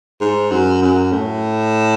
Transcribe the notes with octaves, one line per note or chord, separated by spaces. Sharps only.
G#2
F#2
F#2
A2